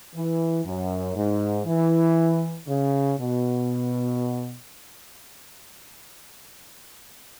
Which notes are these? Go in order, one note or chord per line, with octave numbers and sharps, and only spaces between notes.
E3
F#2
G#2
E3
C#3
B2